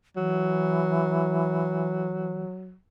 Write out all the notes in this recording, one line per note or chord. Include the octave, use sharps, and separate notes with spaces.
E3 F#3